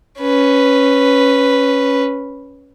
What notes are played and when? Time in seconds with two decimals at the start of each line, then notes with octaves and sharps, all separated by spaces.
0.21 C#4 B4